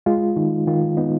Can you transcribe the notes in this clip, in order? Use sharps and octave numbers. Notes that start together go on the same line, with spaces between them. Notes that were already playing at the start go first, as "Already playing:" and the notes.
G#3 F4
D#3 D#4
D#3 F4
B3 D#4